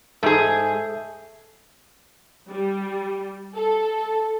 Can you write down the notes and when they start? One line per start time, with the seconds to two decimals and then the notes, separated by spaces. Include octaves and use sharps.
0.23 G#2 G#4 A4 E5 G6
2.49 G3
3.55 A4